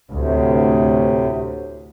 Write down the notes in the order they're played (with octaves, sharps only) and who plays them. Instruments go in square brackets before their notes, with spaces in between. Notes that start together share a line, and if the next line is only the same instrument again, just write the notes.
[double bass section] D2 [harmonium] A2 C3